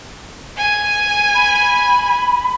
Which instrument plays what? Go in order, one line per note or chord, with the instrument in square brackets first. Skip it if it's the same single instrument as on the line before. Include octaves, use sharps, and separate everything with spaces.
[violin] G#5
[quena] B5